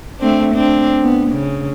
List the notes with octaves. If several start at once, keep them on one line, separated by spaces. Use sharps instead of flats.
A3 C4 D4
C4 D4
B3
C#3